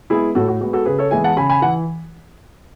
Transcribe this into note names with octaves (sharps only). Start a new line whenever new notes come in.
G#3 B3 E4 G#4
A2 F#4 A4
F#4
G#3 B3 F#4
F#4 A4
C#3 G#4 B4
A4 C#5
E3 G#3 B3 E5 G#5
F#5 A5
C#3 G#5 B5
G#5 B5
E3 F#5